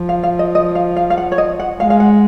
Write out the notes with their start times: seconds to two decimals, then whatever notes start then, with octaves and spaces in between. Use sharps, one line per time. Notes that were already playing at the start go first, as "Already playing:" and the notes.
Already playing: F3
0.09 F5
0.23 F5
0.39 D#5
0.55 D#5
0.75 F5
0.96 F5
1.10 F5
1.17 F#5
1.32 C#5
1.38 D#5
1.60 F#5
1.80 G#3 F5
1.90 F5
2.00 F#5